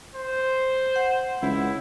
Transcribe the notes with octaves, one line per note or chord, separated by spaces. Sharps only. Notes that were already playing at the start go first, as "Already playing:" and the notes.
C5
F#5
C#2 E4